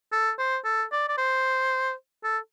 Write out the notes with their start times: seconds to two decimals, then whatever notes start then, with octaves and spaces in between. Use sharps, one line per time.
0.12 A4
0.38 C5
0.65 A4
0.92 D5
1.08 D5
1.18 C5
2.24 A4